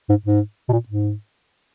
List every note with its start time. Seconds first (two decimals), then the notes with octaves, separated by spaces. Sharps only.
0.09 G#2
0.25 G#2
0.69 B2
0.72 A#2
0.88 G#2